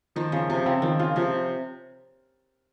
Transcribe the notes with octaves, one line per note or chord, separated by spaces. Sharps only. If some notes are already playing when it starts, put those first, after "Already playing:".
D#3 F3
C#3 F3
C3 F3
C#3 C4
D#3 F3
C#3 F4
C3 F3